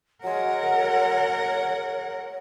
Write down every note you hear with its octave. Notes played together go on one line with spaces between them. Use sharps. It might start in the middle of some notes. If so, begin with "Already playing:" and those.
F#3 G#3 A#4 C#5 F#5